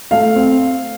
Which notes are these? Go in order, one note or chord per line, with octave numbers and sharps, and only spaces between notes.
A3 F5
C4